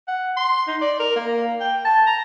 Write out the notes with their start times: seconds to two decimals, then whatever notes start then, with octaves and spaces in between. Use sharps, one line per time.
0.08 F#5
0.37 C6
0.68 D#4
0.81 D5
1.00 A#4
1.16 A#3
1.60 G5
1.85 A5
2.07 A#5